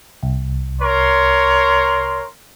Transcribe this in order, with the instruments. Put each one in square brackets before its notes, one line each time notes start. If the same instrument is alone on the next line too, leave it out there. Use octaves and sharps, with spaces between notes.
[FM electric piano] C2
[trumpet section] A#4 C#5 C6